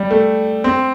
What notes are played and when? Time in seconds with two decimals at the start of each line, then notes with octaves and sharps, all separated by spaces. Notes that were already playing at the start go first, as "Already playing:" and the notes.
Already playing: G3
0.11 A3
0.64 C4